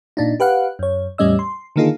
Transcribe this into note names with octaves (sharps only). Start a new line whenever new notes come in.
A#2 D4 D#4
G4 B4 F5 F#5
F#2 C#5
E2 A2 G3 C#4 D#5 E6
C6
D3 D#3 A#3 D#4 F4 G#4